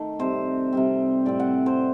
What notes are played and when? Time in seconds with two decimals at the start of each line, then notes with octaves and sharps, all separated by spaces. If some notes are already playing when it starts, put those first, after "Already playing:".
Already playing: D#3 A3
0.19 C3 G3 C4 C5
0.73 C3 G3 C4
1.26 A2 G3 C4 D5
1.40 F#5
1.66 C5